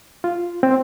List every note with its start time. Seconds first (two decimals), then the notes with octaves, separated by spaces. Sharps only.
0.24 F4
0.63 C4